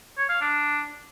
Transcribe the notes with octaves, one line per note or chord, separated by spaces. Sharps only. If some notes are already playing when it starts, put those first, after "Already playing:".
C#5
F5
D4